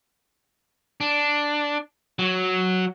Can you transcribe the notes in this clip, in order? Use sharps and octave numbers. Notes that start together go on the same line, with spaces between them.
D4
F#3